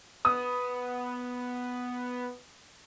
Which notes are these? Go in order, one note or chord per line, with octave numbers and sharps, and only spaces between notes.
B3 D#6